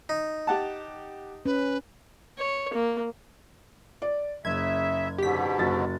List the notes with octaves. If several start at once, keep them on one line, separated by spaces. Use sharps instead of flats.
D#4
G4 F#5 A5
C#4 B4
C#5
A#3
D5
F#1 C#3 E5 G#6
G#2 B2 D3 G4 B6
F#1 F#4 A6